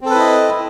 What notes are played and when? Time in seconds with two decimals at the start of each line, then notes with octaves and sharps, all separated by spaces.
0.01 C4
0.06 A4
0.10 B4
0.15 E4
0.20 D#5